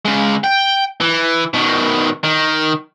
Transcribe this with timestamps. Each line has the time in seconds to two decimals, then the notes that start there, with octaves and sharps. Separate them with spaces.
0.05 C#3 G#3
0.44 G5
1.01 E3
1.54 B2 D#3
2.24 D#3